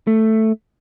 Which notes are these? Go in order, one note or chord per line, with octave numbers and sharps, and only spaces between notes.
A3